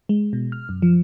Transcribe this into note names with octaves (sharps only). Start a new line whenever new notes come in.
G#3
B2
F6
F#2
F3